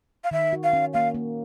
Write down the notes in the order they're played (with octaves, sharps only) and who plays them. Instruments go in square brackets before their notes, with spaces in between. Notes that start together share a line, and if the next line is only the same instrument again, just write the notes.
[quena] F5
[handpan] D#3 [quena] E5
[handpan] F#4
[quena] F5
[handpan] C#4
[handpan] A#3 [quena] F5
[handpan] A#3